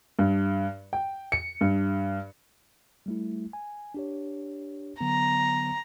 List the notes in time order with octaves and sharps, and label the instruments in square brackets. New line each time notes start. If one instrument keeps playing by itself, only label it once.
[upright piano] G2
G5
C#7
G2
[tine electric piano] G3 A3 E4
G#5
D4 G4 C#5
[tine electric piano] D3 F#3 B3 [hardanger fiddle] A#5